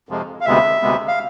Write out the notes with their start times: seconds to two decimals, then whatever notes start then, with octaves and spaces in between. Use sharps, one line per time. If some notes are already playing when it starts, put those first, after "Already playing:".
0.09 F2 C3 F3 G#3
0.41 F5
0.46 D2 C3 G#3 B3 E5
0.82 D2 C3 G#3 B3
1.08 F5